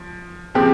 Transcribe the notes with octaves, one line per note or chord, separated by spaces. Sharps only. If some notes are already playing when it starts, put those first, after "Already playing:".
Already playing: F3
C#3 F3 C4 G4